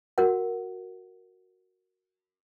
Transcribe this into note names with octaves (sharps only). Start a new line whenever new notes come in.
F#4 A#4 F#5